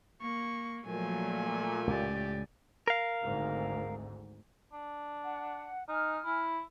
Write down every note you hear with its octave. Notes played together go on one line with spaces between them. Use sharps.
A#3 C#6
A#2 F3 F#3 A3 G#5
C#2 A2 G4 D5
A#4 F5
G#1 D2 G#2
D4
F#5
D#4 G#5 F6
E4